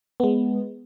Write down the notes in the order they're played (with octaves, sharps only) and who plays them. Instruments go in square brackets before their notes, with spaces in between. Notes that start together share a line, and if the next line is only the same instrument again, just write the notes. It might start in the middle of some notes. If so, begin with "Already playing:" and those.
[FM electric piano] G#3 B3